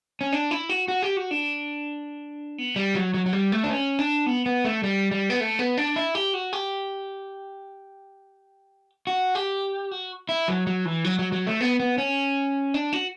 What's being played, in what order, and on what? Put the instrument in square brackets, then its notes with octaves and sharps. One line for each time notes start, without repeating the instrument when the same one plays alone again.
[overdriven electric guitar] C#4
D4
E4
F#4
F#4
G4
F#4
D4
B3
G3
F#3
F#3
F#3
G3
A3
D4
C#4
D4
B3
B3
A3
G3
G3
B3
A3
B3
D4
E4
G4
F#4
G4
F#4
G4
F#4
E4
F#3
F#3
E3
F#3
F#3
F#3
A3
B3
B3
C#4
D4
F#4